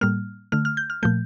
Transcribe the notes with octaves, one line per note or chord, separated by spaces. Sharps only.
A2 G3 A#3 F6
D3 A3 F6
F6
G6
F6
A#2 F3 A3 G6